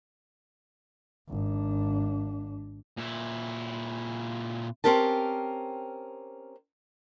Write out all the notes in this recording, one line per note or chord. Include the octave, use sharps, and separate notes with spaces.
G#1 D4
A#2 E4
C4 C#4 G4 A#4 A5